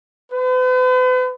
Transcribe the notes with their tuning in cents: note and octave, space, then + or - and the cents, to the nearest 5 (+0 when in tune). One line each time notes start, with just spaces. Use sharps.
B4 +45